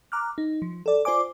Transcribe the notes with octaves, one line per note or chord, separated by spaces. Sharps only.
A#5 D6 F6 F#6
D#4
F3
A4 D5
F4 C5 D5 G#5 D6